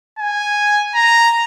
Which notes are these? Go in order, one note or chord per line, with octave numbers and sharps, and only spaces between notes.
G#5
A#5